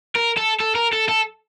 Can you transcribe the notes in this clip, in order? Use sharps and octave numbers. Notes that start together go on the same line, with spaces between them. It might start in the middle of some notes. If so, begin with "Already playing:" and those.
A#4
A4
A4
A#4
A4
A4